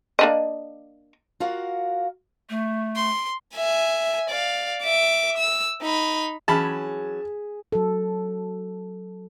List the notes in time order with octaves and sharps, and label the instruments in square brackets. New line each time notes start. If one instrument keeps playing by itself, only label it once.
[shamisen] A#3 D4 D#5
[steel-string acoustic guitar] F4 F#4 A#4 F5 F#5
[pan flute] A3
[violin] C6
E5 G#5
D5 F5
E5 D6
E6
D#4 B5
[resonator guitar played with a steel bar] E3 F#3 C#4 [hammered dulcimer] G#4 [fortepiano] A5 B5
[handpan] F#3 A4